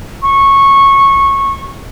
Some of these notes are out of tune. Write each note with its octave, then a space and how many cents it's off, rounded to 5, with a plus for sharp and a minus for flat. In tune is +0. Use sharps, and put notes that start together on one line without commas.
C#6 -15